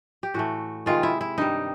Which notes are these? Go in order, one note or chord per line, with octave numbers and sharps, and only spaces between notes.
G4
A2 E3 A3 F#4
C3 D#3 G#3 F4
E4
E4
G2 D#3 G3 D#4